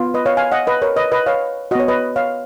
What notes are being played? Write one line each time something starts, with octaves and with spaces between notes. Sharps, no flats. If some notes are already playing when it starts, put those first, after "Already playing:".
Already playing: B3 F4
B4 D#5
C#5 F5
F5 G#5
D#5 F#5
B4 D#5
A#4 C#5
B4 D#5
B4 D#5
C#5 F5
B3 F#4 C#5 D#5
B4 D#5
C#5 F5